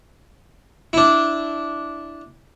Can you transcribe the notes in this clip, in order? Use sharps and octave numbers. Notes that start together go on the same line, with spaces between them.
D4 E4